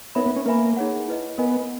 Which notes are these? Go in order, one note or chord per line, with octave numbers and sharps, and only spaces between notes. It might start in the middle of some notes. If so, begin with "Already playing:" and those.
B3 D#4 A#4 C#5 E5 B5
B3
C#4
A#3 B4 E5 G#5 B5
D#4 G#4 C#5 F#5
E4 B4 D#5
B3 A#4 D#5 G#5